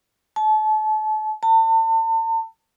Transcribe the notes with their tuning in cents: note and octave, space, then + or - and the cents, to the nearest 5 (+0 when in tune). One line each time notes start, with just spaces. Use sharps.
A5 -35
A5 +40